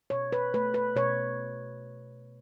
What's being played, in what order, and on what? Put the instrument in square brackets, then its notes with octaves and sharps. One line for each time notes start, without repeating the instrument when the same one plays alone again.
[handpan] B2 C#5
B4
A3 B4
B4
B2 C#5